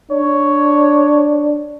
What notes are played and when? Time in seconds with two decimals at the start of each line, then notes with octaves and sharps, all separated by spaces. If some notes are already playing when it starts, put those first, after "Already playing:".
0.11 D4 C#5